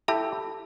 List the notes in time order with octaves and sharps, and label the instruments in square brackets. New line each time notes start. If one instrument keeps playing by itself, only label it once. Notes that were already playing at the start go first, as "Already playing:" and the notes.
[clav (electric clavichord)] E4 G4 [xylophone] A4 E5 A5